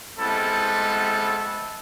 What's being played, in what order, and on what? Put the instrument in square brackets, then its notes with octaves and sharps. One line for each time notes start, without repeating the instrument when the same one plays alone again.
[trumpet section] G3 G#3 B3 C4 E4 A4